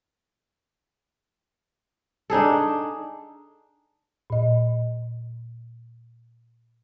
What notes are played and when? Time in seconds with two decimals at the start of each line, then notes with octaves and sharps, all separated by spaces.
2.30 D4 D#4 G#4 A4
4.30 A#2 D#5